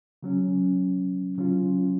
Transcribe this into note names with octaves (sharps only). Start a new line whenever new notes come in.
C#3 F#3 C#4
C#3 F#3 C#4 F4